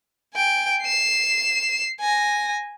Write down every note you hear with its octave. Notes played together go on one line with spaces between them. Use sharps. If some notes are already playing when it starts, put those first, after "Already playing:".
G5 G#5
C7 E7
G#5 A#6